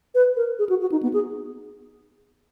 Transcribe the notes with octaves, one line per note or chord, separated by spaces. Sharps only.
B4
A#4
G#4
F#4
F#4
D#4
B3
G#4